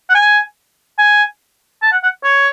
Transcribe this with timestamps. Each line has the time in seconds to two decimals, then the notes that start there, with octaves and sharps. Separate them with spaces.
0.09 F#5
0.15 G#5
0.98 G#5
1.82 A5
1.92 F#5
2.03 F#5
2.23 C#5